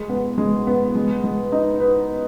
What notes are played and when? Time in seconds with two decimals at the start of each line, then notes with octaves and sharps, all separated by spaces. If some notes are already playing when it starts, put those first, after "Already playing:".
Already playing: G#3
0.09 B3
0.38 G#3
0.67 B3
0.95 G#3
1.24 G#3
1.52 D#4
1.80 B4